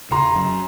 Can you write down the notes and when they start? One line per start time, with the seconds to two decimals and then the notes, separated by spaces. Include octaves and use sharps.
0.11 C#3 A#5 C6
0.35 F#2